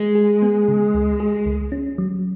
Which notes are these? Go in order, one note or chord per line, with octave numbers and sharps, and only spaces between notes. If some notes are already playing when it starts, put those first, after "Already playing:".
Already playing: G#3
G#4
B3
C#3
C#2
G#4
C#2
C#4
F#3